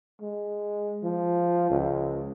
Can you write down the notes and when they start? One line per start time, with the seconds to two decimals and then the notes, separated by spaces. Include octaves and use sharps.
0.21 G#3
1.03 F3
1.70 C#2